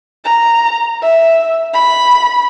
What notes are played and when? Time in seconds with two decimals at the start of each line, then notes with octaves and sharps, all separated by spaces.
0.24 A#5
1.02 E5
1.74 B5